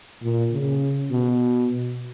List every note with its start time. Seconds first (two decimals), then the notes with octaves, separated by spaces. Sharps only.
0.23 A#2
0.52 C#3
1.11 B2